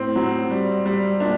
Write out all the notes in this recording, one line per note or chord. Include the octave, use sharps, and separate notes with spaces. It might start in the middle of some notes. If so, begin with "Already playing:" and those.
Already playing: A2 C4
F#3
G3
G3
A#2 D4